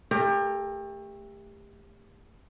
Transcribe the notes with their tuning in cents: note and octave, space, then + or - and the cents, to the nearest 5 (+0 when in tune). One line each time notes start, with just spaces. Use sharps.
A3 +0 G4 +30 A#4 -5